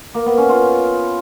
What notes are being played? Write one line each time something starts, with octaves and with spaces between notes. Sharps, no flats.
A#3
B3
C#4
F4